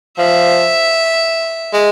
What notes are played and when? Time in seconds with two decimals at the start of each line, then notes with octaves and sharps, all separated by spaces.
0.18 F3 E5
1.73 G#3